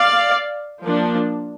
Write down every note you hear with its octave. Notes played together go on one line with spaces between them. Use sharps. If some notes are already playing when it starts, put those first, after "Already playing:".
Already playing: D5 F5
F3 A#3 D4